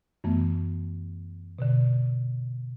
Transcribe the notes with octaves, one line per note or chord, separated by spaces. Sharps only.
F#2 E3 A3 B3
B2 D3